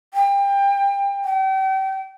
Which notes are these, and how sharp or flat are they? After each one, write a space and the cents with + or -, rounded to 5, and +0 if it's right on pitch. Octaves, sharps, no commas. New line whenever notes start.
G5 +30
G5 -35